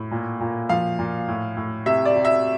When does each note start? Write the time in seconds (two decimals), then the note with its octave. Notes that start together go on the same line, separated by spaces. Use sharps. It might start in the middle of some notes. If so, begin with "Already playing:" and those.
Already playing: A2
0.11 A#2
0.40 A#2
0.69 F3 F5
0.99 A#2
1.28 A2
1.57 A2
1.86 C3 E5
2.05 D5
2.15 C3
2.25 E5